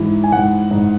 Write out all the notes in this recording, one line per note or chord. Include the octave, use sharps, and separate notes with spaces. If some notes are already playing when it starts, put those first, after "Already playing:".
Already playing: G#2 E3
G#5
G#2 F#5
G#2